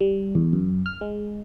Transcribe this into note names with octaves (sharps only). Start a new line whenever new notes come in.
G3
E2
F#2
F6
G#3